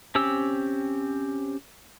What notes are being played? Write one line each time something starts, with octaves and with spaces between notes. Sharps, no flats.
C4 C#4 G4 E6